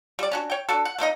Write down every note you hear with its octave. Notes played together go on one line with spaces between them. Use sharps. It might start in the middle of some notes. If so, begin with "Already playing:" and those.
G3 D5
C#4 D4 F#4
C#5 G5
D4 F#4 A4
F#5
A3 A#3 D#4 D#5